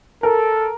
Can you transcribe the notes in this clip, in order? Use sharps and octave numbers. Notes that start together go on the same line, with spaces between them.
A4 A#4